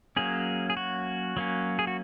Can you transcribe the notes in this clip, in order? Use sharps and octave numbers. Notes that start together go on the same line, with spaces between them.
F#3 A#3 C#4 G#4
G#4
F#4
F#3 A#3 C#4
G#4
F#4